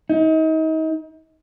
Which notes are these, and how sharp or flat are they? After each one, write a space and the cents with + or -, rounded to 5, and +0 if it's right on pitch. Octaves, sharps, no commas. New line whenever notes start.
D#4 +35